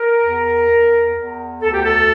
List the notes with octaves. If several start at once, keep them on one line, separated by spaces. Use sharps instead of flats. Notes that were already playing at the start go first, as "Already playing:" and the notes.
Already playing: A#4
E2
E2
E2
D2 A4
G4
A4